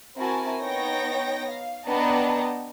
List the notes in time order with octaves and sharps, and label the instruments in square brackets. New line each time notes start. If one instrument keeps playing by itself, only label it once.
[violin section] C4 E4 F#4 A#4 G#5 A5
B3 D#4 C#5 G5 A#6
F5
B3 D4 D#5 G5 A5 A#5